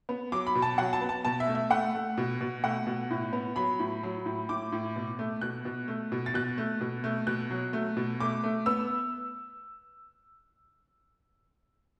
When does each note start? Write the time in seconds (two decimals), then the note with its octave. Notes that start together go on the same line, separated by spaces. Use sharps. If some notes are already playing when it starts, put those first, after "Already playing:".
0.09 B3
0.32 F#3 D6
0.47 B5
0.55 B2
0.62 A5
0.78 F#3 F#5
0.93 A5
1.01 B3
1.09 A5
1.25 B2 A5
1.40 E5
1.48 A3
1.55 E5
1.70 A3 F#5
1.95 A3
2.17 B2
2.41 B2
2.64 A3 F#5
2.87 B2
3.10 A2
3.33 B3
3.56 F#3 B5
3.79 A2
4.03 F#3
4.26 A2
4.49 A2 D6
4.72 A2
4.96 B2
5.19 A3
5.41 B2 F#6
5.65 B2
5.88 A3
6.12 B2
6.26 A6
6.34 B2 F#6
6.58 A3
6.81 B2
7.04 A3
7.27 B2 F#6
7.51 F#3
7.73 A3
7.97 B2
8.20 A3 D6
8.44 A3
8.66 B3 E6